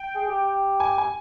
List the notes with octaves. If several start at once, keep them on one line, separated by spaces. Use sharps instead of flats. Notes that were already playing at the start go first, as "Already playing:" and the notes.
Already playing: G5
G#4
G4
G#5
G#5